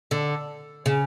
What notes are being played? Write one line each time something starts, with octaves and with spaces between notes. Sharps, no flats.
D3
C#3